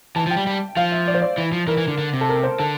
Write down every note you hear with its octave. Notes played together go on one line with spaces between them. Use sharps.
E3 A5
F3
G5
G3
G3
F3 F5
E5
D5
C5
D5
E3
F3
E3 A#4
E3
D3
D3
C3
A4
A#4
C5
D3 A4